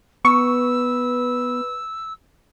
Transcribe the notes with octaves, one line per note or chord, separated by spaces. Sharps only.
B3 B4 C#6 E6